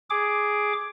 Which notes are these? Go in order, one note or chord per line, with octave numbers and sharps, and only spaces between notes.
G#4 D6